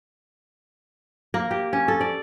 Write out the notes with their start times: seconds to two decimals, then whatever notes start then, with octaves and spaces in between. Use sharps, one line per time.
1.34 A#3
1.51 G4
1.73 C#4
1.88 A4
2.01 D5